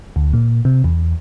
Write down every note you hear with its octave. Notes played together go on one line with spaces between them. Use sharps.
D2
A#2
C3
E2